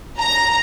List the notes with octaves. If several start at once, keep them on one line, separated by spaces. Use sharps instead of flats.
A#5